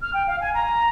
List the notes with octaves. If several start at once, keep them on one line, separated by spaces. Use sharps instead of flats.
F6
G5
F5
G#5
A#5